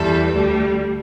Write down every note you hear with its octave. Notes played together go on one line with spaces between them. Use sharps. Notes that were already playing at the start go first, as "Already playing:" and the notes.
Already playing: E2 E3 G3 A4
D2 D3 G3